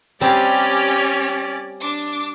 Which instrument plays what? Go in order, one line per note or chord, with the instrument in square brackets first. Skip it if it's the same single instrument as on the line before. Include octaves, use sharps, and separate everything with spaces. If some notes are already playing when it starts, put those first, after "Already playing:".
[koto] G3 C4 A5 [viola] C#4 D5 [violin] G4 F7
[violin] D4 D6